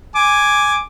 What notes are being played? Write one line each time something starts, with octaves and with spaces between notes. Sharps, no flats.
G#5 D6